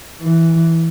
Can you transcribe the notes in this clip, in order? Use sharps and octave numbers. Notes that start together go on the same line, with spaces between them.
E3